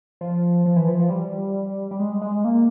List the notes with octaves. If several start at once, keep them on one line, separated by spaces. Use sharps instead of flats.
F3
F3
E3
F3
F3
G3
G3
G#3
G#3
A#3